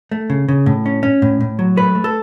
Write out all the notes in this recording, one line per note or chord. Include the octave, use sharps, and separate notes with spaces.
A3
C#3
C#3
A2
C#4
C#4
A2
A2
F#3
A3 B4
A3
A4